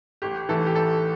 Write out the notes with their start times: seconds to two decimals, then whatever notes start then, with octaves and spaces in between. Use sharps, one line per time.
0.22 A1 G4
0.49 A2 E3 A4
0.66 G4
0.75 A1 A4